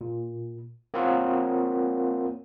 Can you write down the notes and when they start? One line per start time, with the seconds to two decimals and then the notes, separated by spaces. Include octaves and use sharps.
0.01 A#2
0.94 A#3 C4 F4 A#4 C#5 F#5